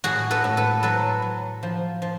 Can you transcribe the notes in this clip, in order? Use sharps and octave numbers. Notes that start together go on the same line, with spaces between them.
A2 F#4 G#4
A4 B4
A2
A4 B4
F#3 A4 B4
F#3
F3
F3